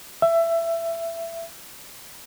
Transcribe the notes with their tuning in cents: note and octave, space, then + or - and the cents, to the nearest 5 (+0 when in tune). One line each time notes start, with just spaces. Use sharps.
E5 +20